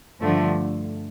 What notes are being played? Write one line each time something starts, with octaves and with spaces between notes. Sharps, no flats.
G2 D3 F3 A3